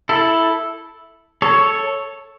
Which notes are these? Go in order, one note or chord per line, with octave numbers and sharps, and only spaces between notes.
E4 A4
A4 C#5